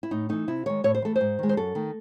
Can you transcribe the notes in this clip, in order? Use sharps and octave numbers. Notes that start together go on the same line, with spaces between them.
E4
A2 D#4
E3 A3 D#4
C3 E4
D#3 G#3 C#5
A2 C#5
C5
E3 A3 A4
C5
G#2
D#3 G#3
C5
F#2 A4
D#3 A3